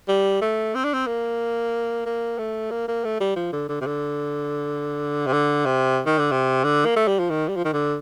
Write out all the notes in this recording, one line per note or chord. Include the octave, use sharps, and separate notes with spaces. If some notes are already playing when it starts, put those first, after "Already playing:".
G3
A3
C4
D4
C4
A#3
A#3
A3
A#3
A#3
A3
G3
F3
D3
D3
C3
D3
C3
D3
C3
D#3
D3
C3
D3
A#3
A3
G3
F3
D#3
G3
F3
D#3
D3